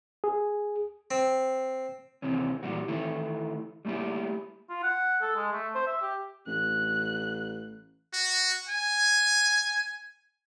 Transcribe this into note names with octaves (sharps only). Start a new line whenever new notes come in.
G#4
C4
D#2 C3 E3 C4 C#4
A#2 E3 G3 F#4
D#3 E3 A3 E4
G3 A3 A#3 E4 G4
F4
F#5
A4
G#3
A3
C5
E5
G4
A1 F#6
F#4
G#5